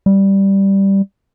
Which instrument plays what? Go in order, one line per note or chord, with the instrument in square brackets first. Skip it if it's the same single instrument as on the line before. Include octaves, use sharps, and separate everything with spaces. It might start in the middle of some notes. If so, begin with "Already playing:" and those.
[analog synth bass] G3